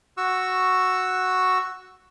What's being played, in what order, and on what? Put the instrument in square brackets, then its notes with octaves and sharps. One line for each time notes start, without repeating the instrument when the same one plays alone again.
[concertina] F#4 C#6 E6